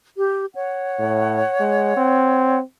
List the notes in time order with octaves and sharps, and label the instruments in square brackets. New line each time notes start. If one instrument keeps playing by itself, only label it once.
[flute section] G4
C#5 F#5
[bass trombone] A2
G#3
C4